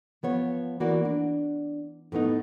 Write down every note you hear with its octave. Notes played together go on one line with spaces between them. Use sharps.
F3 B3 C#5
E3 A#3 F#4 D5
D4
A2 A3 B3 D#4